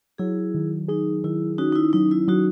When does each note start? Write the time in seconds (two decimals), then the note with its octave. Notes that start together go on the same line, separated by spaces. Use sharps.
0.18 F#3 E4 G#4
0.54 D#3
0.88 D#4 G#4
1.24 D#3 E4
1.58 C#4 D#4 F#4
1.72 D#4
1.75 E4
1.93 F#3 D#4
2.11 E4
2.28 F#3 D#4 F#4